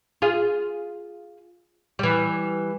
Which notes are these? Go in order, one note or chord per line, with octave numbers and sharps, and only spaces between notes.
F4 G#4
E3 G3